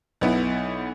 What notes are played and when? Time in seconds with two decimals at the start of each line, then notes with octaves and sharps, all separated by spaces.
0.21 B1 B3 E4